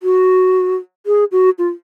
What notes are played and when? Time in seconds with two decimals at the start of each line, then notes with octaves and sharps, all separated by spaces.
0.03 F#4
1.06 G#4
1.32 F#4
1.58 F4